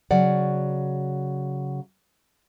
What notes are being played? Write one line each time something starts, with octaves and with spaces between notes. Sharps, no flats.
C#3 F#3 D5 F#5